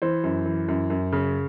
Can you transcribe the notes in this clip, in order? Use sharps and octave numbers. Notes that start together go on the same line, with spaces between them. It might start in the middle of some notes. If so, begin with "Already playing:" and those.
E3 C5
F#2
E3
F#2
F#2
C#3